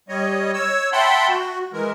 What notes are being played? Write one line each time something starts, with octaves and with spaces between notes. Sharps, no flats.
G3 C#5 D#5
C#5 E6
E5 F#5 G5 A5 B5 C6
F#4
E3 G#3 A#4